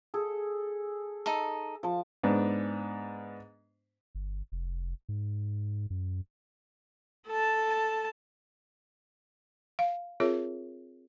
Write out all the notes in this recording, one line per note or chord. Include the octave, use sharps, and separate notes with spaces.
G#4 A4
D#4 A4
F3 A5
G#2 B3 D4
G1
F1
G#2
F#2
A4 A5
F5
C4 F4 G#4 A#4 C#5 E5